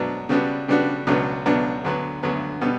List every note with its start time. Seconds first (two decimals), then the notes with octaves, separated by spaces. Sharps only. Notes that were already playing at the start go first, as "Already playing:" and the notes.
Already playing: B2 F#3 B3 D4
0.29 C#3 G3 B3 D4 F#4
0.68 C#3 G3 B3 D4 F#4
1.07 C#2 B2 F#3 B3 D4
1.46 C#2 B2 F#3 B3 D4
1.84 D2 D3 F#3 B3
2.23 D2 D3 F#3 B3
2.61 B2 G3 B3